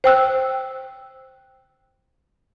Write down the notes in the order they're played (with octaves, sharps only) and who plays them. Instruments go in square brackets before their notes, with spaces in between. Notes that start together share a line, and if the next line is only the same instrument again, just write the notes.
[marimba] C5 G5 E6 F#6